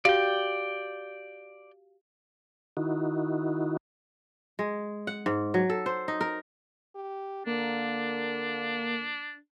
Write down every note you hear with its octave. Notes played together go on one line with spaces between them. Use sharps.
F#4 G4 D5 F5 G5
D#3 D#4 E4 F#4
G#3
F#5
G#2
F#3
A4
C5
D#4
A#4
G4
D3 A#3 D4